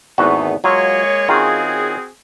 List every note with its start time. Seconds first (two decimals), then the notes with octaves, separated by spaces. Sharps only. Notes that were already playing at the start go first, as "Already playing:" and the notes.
0.18 G#1 E2 E3 A3 B3 F#4
0.64 F#3 G#3 A#3 F4 C#5
1.28 D#3 C4 C#4 F4 F#4 G#4